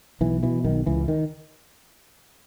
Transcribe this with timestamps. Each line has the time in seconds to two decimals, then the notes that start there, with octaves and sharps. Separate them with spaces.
0.21 B1 E3
0.43 B2 E3
0.64 B1 D#3
0.86 C#2 E3
1.08 D#3